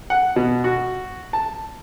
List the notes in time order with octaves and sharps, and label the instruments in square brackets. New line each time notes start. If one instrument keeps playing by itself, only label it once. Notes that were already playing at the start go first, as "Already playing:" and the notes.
[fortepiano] F#5
B2
F#4
A5